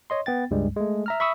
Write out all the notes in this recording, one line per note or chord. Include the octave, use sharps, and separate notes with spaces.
C#5 D#5 C6
B3 G5 A6
C#2 G2 G3 G#3
G#3 A3
E5 A#5 F6
E5 B5 C#6 D#6 E6